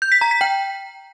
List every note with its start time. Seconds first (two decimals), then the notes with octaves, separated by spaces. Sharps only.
0.02 G6
0.12 B6
0.21 A#5
0.31 B6
0.41 G5